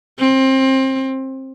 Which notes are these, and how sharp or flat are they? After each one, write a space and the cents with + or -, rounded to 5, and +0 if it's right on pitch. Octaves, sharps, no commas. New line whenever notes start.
C4 +25